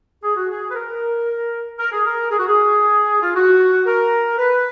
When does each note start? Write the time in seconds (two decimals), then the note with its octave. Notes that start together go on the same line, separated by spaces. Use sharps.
0.23 G#4
0.36 F#4
0.50 G#4
0.70 B4
0.74 A#4
1.78 A#4
1.92 G#4
2.05 A#4
2.31 G#4
2.38 F#4
2.47 G#4
3.22 F4
3.34 F#4
3.86 A#4
4.38 B4